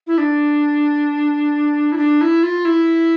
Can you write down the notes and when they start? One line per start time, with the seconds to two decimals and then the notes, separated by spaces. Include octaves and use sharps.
0.07 E4
0.18 D4
1.92 E4
1.98 D4
2.21 E4
2.43 F4
2.65 E4